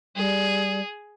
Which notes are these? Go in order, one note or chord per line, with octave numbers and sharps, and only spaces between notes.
G3 G#4